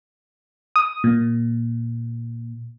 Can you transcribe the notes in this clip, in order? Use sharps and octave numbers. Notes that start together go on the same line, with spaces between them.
D#6
A#2